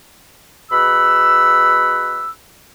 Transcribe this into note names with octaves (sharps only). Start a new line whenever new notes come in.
B2 G#4 F#5 B5 E6